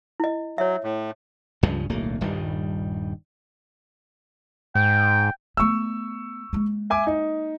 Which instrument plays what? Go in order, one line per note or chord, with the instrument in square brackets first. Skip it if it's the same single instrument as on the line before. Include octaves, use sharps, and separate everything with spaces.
[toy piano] E4 D#5
[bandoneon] F#3 [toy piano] C#5 E5
[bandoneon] A2
[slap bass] C#2 G2 C#3 F3
D1 B1 A3 A#3
D#1 G2 D#3 G3
[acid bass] G#2 [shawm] G5
[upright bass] A3 B3 [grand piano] C#6 E6
[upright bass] G#3 A#3
[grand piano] E5 G#5 D6
D#4